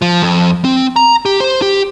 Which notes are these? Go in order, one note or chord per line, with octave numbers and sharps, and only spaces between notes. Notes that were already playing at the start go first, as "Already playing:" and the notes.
F3
F2
C4
A#5
G4
C5
G4